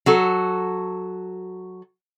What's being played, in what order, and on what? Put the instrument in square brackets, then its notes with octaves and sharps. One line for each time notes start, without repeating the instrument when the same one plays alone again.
[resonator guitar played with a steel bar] F#3 F#4 A4